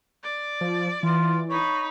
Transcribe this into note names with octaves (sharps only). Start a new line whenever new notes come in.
D5
F3
E3 F4
D#4 C#5 B5